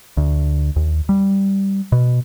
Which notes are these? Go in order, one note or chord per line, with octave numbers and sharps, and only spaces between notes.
D2
D#2
G3
B2